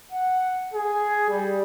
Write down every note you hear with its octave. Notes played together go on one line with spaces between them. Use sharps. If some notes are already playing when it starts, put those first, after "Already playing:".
F#5
G#4
G3